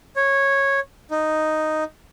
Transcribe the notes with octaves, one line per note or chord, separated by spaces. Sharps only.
C#5
D#4